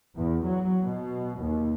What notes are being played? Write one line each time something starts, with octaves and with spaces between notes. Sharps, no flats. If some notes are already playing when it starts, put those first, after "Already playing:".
E2
F#3
B2
D#2